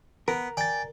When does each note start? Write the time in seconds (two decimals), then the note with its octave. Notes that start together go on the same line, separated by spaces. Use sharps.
0.28 B3 A#4
0.57 D5 G5 G#5 A6